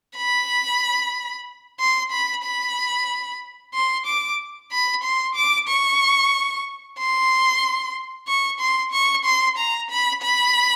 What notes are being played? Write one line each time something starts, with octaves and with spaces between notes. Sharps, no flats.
B5
C6
B5
B5
C6
D6
B5
C6
D6
C#6
C6
C#6
C6
C#6
C6
A#5
B5
B5